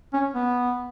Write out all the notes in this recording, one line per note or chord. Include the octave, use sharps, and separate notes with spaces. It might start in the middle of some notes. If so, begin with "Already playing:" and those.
C#4
B3